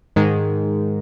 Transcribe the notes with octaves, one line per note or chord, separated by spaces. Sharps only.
G#2 D#3 G#3